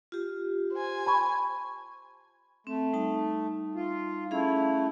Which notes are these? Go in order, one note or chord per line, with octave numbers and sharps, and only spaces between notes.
F4 G4
C5 G#5
A5 B5 C#6
A3 C4
G3 D#4 A5
F4
A3 C#4 E4 G#4 F5